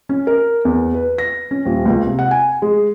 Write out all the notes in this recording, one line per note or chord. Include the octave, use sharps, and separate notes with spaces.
C#4
A#4
E2
B4
A#6
C#4
D#1
C#2
C3
F#5
G#5
G#3